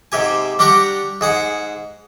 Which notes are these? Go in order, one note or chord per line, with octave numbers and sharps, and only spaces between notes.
G#2 C3 G4 G#5
G3 D4 G4 F#5 A#5 C#6
G#2 G#4 F#5